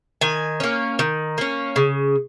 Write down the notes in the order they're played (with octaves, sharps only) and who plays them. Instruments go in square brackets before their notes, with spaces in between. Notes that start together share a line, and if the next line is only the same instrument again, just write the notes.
[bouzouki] D#3 G#5
A#3 C#4
D#3
A#3 C#4
C#3